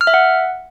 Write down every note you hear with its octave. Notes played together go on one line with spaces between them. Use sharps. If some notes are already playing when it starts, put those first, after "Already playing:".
F6
E5
F#5